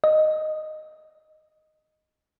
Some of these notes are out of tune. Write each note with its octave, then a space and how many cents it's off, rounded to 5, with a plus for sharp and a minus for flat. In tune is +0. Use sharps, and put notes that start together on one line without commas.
D#5 -5